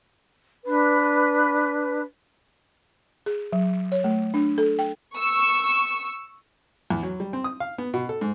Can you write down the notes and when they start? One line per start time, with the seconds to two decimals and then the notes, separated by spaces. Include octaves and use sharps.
0.66 D4 B4
3.26 G#4
3.53 F#3
3.92 C#5
4.04 A3
4.34 D4
4.58 A4
4.79 G5
5.17 C#6 E6
6.90 E2
7.03 F#3
7.20 G3
7.33 C4
7.44 D#6
7.60 F5
7.78 B3
7.94 B2
8.09 A4
8.21 G#2